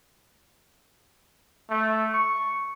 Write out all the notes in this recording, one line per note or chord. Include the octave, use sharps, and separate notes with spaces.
A3
C#6